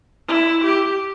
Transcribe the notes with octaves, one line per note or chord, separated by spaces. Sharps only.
E4
G4